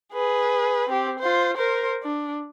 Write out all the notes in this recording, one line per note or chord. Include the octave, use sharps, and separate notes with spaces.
G#4 B4
C4 G4
F4 C5
A#4 C5
D4